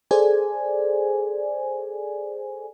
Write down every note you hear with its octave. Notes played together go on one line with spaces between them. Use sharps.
G#4 A4 C5 D5 G#5